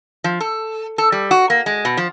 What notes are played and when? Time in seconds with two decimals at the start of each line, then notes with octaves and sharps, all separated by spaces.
0.24 F3
0.40 A4
0.98 A4
1.12 G3
1.31 F#4
1.50 A#3
1.66 G#3
1.85 B2
1.97 F3